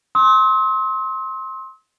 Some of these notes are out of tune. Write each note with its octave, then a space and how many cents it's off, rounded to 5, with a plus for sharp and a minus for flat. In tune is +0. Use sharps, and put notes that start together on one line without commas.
C6 +20 E6 -45